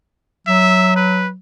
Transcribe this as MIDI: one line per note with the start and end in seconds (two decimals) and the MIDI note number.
0.47 1.36 54
0.47 0.94 76
0.96 1.27 71